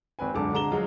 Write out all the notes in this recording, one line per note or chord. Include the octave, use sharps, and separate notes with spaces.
G#1 C4 B4 G#5
C#2 F#2 D3 A5 D6
D3 G#3 A#5 E7 G7
F3 F#3 G#3 F4